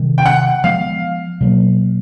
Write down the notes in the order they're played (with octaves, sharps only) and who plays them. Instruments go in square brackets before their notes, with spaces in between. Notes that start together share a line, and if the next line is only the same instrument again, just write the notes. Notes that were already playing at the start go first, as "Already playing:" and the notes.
Already playing: [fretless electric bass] C3 D#3 G3
[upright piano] G5
F#5
[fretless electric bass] F3 G#3 B3 [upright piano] F5
[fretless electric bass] B2 F#3 A#3